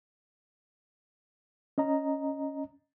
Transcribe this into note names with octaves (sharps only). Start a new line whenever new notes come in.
C#4 D#5 A#5